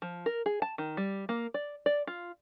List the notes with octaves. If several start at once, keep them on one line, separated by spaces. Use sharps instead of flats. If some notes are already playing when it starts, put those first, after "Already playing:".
F3
A#4
G#4
A5
D#3
G3
A#3
D5
D5
F4